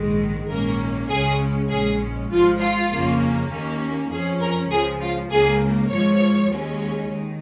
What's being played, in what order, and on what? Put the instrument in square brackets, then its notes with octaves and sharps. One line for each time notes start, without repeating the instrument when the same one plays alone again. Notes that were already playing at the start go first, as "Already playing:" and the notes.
Already playing: [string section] A#1 G#2 D#3 G#3
A#1 G#2 D#3 A#3 C#4 A#4
C#2 C#3 G#3 C#4 G#4
A#1 G#2 G#3 C#4 G#4
G#1 G#2 F3 F4
F4
F2 C#3 A#3 C#4
D#2 D#3 A#3 C#4
F2 F3 C#4 G#4
A#4
C#2 C#3 F3 G#4
F4
C#2 C#3 A#3 G#4
G#1 G#2 F3 C#5
D#2 D#3 G#3 C#4
D#3